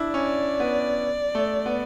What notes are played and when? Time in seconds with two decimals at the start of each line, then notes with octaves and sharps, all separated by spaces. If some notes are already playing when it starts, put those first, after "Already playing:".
Already playing: D4 E4
0.14 C#4 D5
0.60 B3
1.35 A3
1.66 B3